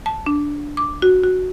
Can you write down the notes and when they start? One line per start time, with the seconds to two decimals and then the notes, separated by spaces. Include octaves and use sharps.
0.06 A5
0.26 D4
0.77 D6
1.02 F#4
1.24 F#4